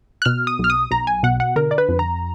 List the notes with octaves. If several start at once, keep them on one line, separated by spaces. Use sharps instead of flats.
F#6
B2 F6
D#6
B1 F6
D#6
B1 A#5
G#5
B2 F#5
F#5
D3 A#4
D5
B4
F2
A#5